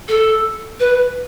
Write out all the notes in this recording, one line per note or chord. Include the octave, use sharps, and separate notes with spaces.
A4
B4